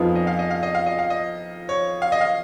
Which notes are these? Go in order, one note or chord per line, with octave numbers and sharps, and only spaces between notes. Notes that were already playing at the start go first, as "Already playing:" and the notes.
Already playing: F2 F3 B3 D#4 G#4
D#5
F5
D#5
F5
D#5
F5
D#5
F5
D#5
C#5
F5
D#5
F5